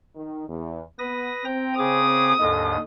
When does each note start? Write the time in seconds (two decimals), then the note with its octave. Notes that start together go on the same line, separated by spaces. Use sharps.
0.15 D#3
0.49 E2
0.99 B3 B4 D#6 A#6
1.45 C4 G5 A#5
1.78 C#3 G#4 D6 D#6
2.40 D#2 G#2 D3 A4 D#5